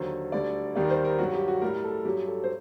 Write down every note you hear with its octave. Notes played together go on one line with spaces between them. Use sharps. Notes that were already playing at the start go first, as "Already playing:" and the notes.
Already playing: D#2 D3 F#3 C5
D2 D3 G3 D5
D#2 D#3 G3 D5
A#4
C5
A#4
G2 F#3 F#4
G4
F#4
A2 G3 A#4
A4
G2 F#3 G4
A4
C5